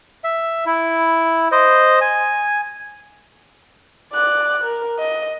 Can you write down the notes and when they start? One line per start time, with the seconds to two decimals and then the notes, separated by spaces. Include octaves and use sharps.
0.24 E5
0.66 E4
1.52 C5 D#5
2.01 G#5
4.13 D5 F#6
4.64 A#4
4.99 D#5